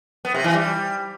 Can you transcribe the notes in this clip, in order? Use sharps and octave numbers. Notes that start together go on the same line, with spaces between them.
B3
C3
E3
G3